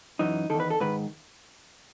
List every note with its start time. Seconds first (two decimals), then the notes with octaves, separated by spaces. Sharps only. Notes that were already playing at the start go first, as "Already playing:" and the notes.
0.19 F#2 E3 D#4
0.50 E2 D#3 A4
0.60 B4
0.70 A4
0.80 G#2 D#3 B4